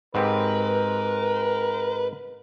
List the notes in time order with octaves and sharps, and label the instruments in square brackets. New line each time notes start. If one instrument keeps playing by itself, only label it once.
[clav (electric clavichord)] G#2 C4 G4 [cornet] A#4 [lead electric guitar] B4